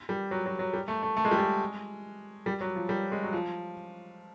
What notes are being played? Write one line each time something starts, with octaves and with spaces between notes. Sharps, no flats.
G3
F#3
F#3
F#3
G3
A3
A3
A3
G#3
G3
G#3
G3
F#3
F3
G3
G#3
F#3
F3